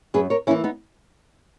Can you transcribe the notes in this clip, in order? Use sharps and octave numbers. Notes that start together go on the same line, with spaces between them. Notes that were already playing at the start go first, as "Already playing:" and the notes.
F#2 G#4 B4
A#4 C#5
E3 A#3 C#4 E4
B3 D#4